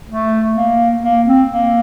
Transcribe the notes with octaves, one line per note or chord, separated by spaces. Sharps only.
A3
A#3
A#3
C4
A#3